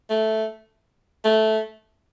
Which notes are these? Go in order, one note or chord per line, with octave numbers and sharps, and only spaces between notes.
A3
A3